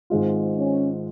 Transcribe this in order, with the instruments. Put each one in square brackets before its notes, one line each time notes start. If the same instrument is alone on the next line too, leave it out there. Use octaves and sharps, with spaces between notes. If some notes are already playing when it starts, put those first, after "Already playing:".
[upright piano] G#1 G#2 G#3 F4
[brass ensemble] C#4